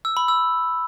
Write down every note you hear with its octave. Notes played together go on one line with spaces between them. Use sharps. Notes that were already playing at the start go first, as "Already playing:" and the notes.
E6
B5
E6